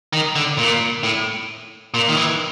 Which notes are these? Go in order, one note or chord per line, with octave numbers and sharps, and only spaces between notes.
D#3
D3
A#2
A2
A#2
D#3
E3